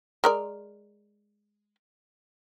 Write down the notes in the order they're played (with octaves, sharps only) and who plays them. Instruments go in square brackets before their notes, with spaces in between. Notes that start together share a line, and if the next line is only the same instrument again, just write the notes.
[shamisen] G#3 A#4 D5